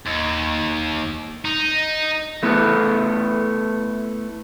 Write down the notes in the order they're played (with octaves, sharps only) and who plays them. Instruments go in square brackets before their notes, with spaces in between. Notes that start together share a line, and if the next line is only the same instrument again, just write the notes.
[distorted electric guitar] D#2
D#4
[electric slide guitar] A3 B3 E4 A4 B4